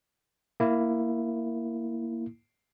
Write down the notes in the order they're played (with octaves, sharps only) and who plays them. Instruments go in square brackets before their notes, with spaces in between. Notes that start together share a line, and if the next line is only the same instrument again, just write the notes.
[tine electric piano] A#3 E4